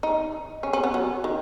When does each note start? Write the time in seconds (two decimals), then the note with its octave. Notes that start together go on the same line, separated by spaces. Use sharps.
0.03 D#4
0.63 C#4
0.73 C#4
0.84 B3
0.94 F#3
1.24 D#3